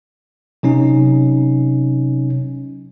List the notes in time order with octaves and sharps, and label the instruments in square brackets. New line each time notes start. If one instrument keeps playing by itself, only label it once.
[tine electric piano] C3 F#3 C#4 D#4